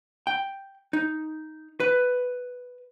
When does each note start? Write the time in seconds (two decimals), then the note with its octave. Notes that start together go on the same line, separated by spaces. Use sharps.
0.27 G5
0.93 D#4
1.80 B4